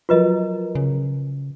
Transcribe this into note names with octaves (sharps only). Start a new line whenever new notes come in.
F3 F#3 F4 A#4 B4 D#5
C#3